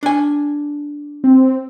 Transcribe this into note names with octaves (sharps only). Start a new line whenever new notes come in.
D4 G#5
C4